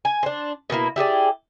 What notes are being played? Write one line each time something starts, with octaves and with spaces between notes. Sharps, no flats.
G#5
D4 C5
B2 A3 A#3 E4
E4 G4 G#4 D5